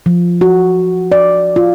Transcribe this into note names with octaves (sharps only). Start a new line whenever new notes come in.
F3
F#4
D5
F4